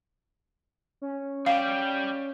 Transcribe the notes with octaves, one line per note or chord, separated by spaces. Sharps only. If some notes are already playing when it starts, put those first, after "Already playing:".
C#4
G3 G4 F5